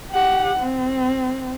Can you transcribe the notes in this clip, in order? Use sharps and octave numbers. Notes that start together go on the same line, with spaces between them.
G4 F#5
C4